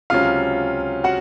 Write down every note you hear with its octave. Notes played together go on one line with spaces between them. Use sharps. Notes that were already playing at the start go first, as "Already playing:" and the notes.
C#2 C3 F#3 C#4 F4 F5
F#4 F#5